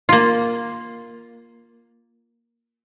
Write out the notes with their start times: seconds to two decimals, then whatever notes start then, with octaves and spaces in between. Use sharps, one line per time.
0.09 A#3 F4